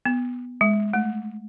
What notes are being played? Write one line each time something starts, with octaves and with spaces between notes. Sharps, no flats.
B3
G#3
A3